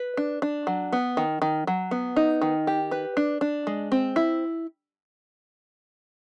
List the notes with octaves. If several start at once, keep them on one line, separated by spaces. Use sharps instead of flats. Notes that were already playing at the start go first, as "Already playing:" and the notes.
Already playing: B4
D4
D4
F#3
B3
D#3
D#3
F#3
B3
D#4
D#3
G4
B4
D4
D4
G#3
C4
E4